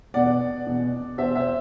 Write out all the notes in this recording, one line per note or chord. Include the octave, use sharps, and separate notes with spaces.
E2 B2 D5 F#5
E2 B2
E2 B2 C5 E5
C5 E5